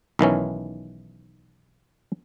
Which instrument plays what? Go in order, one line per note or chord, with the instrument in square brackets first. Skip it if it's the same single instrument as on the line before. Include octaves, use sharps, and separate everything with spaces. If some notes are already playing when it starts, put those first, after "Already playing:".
[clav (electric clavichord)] B1 D#3 E3 C#4